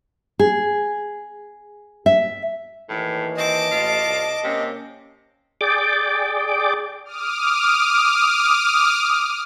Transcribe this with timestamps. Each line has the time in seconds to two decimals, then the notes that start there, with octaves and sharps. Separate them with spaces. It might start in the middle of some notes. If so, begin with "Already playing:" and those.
0.39 G#4
2.06 E5
2.90 D#2 A2 E3
3.36 C4 D#5 A5 D6
3.71 A1 F4
4.05 C2
4.44 C3 A#3 C#4
5.61 G#4 D5 G5 D6
7.05 D6 D#6 F6